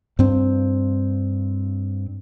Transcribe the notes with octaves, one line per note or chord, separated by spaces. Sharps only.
G2 C4